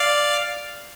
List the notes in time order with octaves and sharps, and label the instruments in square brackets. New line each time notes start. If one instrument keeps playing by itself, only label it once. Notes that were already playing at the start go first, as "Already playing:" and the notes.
Already playing: [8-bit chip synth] D5 F5